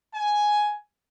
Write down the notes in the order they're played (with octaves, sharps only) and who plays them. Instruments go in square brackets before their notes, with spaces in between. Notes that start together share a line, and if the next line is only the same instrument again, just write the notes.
[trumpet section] G#5